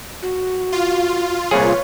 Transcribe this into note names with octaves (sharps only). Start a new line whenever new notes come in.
F#4
F4
C2 A#2 G#4 B4 C#5